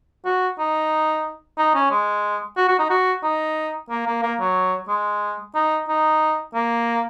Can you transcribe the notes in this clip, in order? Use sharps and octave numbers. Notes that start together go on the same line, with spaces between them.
F#4
D#4
D#4
C#4
G#3
F#4
F#4
D#4
F#4
D#4
A#3
A#3
A#3
F#3
G#3
D#4
D#4
A#3